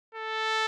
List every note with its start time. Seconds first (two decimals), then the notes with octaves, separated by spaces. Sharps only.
0.15 A4